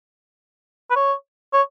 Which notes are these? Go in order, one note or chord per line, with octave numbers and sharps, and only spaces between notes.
B4
C#5
C#5